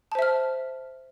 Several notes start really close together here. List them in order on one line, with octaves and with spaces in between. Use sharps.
A5 C5 E5 F6